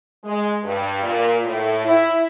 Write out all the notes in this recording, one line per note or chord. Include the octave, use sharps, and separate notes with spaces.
G#3
G2
A#2
A2
E4